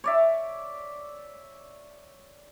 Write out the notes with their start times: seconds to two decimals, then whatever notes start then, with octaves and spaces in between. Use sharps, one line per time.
0.04 C#5 D5 E5